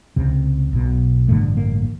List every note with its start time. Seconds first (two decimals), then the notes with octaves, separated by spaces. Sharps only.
0.16 C#2 C3
0.73 B1 B2
1.28 A1 G2 D3 A3
1.57 A#3